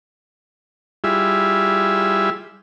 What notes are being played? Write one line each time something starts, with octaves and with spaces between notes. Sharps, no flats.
G3 E4 F4 G#4 E5